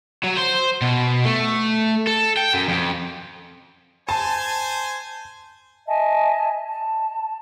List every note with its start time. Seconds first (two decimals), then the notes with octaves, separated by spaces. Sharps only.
0.24 F#3
0.37 C5
0.82 B2
1.25 A3
2.07 A4
2.37 G5
2.54 F#2
2.69 F2
4.09 C5 G#5 A5
5.87 D#5 E5 G#5 A5
6.66 A5